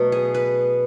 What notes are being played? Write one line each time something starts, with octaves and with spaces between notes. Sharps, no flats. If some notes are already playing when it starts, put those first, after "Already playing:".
Already playing: B2 F#3 A3 F#4
G#4
B4